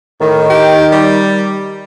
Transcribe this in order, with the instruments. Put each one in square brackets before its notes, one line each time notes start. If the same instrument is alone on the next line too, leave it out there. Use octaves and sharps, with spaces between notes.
[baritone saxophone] A2 [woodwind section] D#3
[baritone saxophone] G4
G3